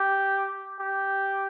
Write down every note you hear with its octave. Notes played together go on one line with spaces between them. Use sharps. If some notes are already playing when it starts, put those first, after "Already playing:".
Already playing: G4
G4